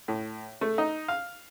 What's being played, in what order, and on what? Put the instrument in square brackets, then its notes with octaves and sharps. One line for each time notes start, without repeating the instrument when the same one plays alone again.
[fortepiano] A2
A3
D#4
F5